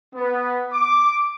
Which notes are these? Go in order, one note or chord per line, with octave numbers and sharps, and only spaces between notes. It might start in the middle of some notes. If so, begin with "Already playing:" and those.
B3
D6